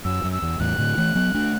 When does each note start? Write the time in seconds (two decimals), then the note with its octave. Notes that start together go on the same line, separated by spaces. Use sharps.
0.05 F#2 E6
0.24 F#2
0.33 E6
0.42 E2
0.60 E2 A2 F#6
0.78 A2 D3
0.97 E3 A3
1.15 F#3 B3
1.34 A3 D4